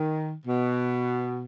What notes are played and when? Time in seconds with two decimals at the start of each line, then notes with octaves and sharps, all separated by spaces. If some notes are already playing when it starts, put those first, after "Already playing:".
Already playing: D#3
0.46 B2